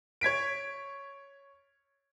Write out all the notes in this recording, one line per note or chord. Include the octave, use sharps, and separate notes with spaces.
C#5 G#6 B6 D7